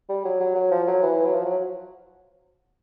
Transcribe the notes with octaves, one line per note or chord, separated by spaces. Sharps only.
G3
F#3
F#3
F#3
F3
F#3
E3
F#3
F3
F#3